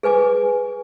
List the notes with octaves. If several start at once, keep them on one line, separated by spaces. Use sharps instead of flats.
G#4 B4 G#5 D6